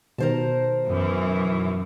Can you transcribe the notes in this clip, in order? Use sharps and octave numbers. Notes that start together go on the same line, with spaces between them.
B2 D#3 A#4 C5 A5
F#2 E3